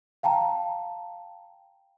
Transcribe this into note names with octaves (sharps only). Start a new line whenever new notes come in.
F5 G5 A5 A#5